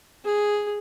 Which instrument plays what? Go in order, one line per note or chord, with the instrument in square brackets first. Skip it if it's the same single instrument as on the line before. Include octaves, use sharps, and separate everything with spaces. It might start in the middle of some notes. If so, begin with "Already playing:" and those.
[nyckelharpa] G#4